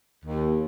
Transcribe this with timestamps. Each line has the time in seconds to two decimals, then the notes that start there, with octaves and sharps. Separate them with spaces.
0.25 D#2